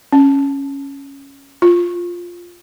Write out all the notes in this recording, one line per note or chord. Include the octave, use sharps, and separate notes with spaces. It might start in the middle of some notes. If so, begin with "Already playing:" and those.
C#4
F4